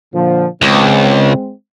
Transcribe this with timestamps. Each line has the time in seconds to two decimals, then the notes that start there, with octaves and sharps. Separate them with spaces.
0.14 A#2 D3 F3
0.62 C#2 G#3 C4